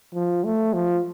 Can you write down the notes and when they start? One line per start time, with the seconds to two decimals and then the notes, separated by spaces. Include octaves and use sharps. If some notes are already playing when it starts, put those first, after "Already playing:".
0.14 F3
0.44 A3
0.73 F3